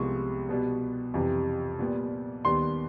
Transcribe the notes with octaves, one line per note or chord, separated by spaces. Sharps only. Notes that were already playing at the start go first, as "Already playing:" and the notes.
Already playing: C2 C3 F3 G#3 B3 C#6
B2 G3 B3
F2 C3 E3 G3
A#2 G3 B3
D#2 D#3 G3 B3 C6